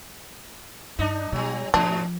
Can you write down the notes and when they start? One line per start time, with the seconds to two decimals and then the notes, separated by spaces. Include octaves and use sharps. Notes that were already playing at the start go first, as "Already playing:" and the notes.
0.99 G2 D4 D#4
1.32 B2 F#3 G3
1.74 G#2 B2 F3 D4